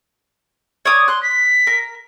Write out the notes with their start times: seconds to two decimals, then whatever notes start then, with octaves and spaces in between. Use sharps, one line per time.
0.85 C#5 D5 D#6
1.08 C6 F#6
1.22 B6
1.67 A#4